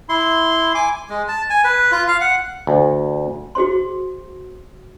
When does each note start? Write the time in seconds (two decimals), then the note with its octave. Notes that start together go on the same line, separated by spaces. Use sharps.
0.09 E4 C6
0.75 G#5 D6
1.10 G#3
1.28 A5
1.50 G#5
1.64 B4
1.92 F4
2.08 F5
2.21 F#5
2.67 D2
3.55 F#4 G#4 C5 C6